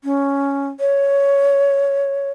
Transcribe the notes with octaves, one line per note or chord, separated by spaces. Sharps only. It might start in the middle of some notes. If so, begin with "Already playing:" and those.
C#4
C#5